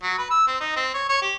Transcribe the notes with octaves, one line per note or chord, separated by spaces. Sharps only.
F#3
B4
E6
C4
D#4
C4
C#5
C#5
G4